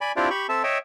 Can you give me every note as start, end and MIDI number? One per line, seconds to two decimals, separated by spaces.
0.01 0.12 74
0.01 0.12 80
0.01 0.12 83
0.16 0.29 60
0.16 0.29 62
0.16 0.29 64
0.16 0.29 65
0.16 0.29 67
0.16 0.29 74
0.30 0.47 67
0.30 0.47 83
0.30 0.47 85
0.49 0.63 60
0.49 0.63 69
0.49 0.63 76
0.49 0.63 81
0.64 0.78 73
0.64 0.78 75
0.64 0.78 76
0.64 0.78 79